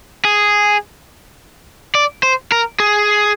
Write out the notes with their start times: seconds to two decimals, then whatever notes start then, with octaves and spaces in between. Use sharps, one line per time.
0.25 G#4
1.95 D5
2.23 C5
2.52 A#4
2.80 G#4